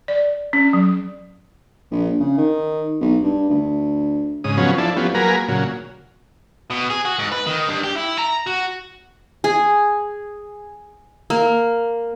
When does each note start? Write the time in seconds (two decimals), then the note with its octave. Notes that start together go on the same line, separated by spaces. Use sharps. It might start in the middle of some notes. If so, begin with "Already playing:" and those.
0.08 D5
0.53 C#4
0.73 F#3
1.91 A#1
2.20 C#3
2.37 D#3
3.01 B1
3.23 G2
3.50 D2
4.44 G#2 C#3 D#6
4.57 C#3 F3 F#3 B3 C#4
4.78 F3 D4 E4 A4
4.96 F3 G3 B3 C#4
5.14 F#3 A#3 G#4 A#4 B4
5.48 A#2 C#3 F#3
6.70 B2
6.90 G#4
7.05 F#4
7.19 G#2
7.32 B4
7.47 D#3
7.68 G2
7.84 G4
7.96 E4
8.19 A#5
8.47 F#4
9.44 G#4
11.30 A#3